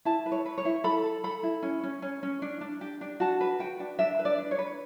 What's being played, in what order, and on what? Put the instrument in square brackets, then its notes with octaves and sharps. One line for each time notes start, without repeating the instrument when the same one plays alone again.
[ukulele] E4 A5
B4
C#5
B4
C#5
E4
A4 B5
A4
A4 B5
E4
C#4
C#4
C#4
C#4
D4
D4
G4
D4
F#4 A5
B4
F#4 G5
D4
D4 E5
B4
D5
D4
C#5
B4